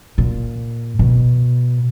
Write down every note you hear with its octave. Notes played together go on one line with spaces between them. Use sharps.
A#2
B2